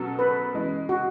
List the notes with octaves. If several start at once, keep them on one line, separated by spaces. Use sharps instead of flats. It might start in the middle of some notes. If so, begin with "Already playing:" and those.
Already playing: B2 F#3 C#4 F#4 A4
B4
E3 G#3 C#4
F#4